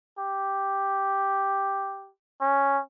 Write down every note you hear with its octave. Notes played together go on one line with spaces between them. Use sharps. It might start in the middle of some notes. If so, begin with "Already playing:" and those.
G4
C#4